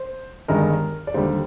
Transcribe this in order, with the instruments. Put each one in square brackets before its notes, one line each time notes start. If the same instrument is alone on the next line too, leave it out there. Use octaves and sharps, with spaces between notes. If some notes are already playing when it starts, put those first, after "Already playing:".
Already playing: [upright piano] C5
G1 G2 D#3 G#3 A#4
D5
D#2 D3 G3 C5